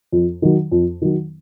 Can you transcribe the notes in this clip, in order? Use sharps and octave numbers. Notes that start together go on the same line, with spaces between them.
F2
D#3 F#3
F2
D#3 F#3